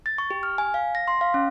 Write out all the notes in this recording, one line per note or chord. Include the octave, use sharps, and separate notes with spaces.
A6
C#6
G4
F6
G#5
F5
A#6
C6
F5
C#4